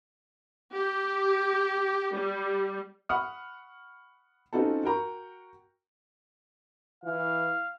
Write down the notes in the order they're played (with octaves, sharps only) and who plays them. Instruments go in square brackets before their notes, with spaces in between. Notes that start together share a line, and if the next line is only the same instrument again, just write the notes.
[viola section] G4
G3
[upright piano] F#5 B5 C#6 D#6 F6
C4 C#4 D#4 F4 F#4 A4
F#4 A#4 G5 A#5 C#6
[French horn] E3 [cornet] F5